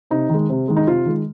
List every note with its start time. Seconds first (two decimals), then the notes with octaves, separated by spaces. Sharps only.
0.11 C3 D#4
0.29 D#3 G#3
0.49 C3
0.68 D#3 G#3
0.77 D#4
0.87 C3 F4
1.06 D#3 G#3